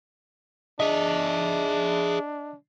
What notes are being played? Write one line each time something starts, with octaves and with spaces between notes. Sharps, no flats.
D4 G#4 D#5 E5